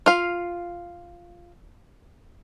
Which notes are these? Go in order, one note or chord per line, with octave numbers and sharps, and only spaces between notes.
F4 F5